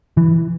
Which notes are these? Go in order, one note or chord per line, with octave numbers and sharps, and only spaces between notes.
E3